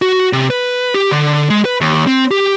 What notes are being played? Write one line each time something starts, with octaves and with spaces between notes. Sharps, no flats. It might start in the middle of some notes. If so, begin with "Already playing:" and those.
F#4
C3
B4
G4
D3
G#3
B4
D#2
C4
G4